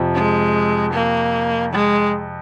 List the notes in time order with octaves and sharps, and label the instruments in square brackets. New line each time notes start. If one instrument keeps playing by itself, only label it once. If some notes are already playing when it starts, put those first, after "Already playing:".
Already playing: [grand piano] F2 C3 F3
[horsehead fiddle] G#3
A#3
G#3